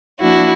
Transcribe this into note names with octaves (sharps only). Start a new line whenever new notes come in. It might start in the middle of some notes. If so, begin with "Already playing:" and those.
F3 A#3 D4 E4 F#4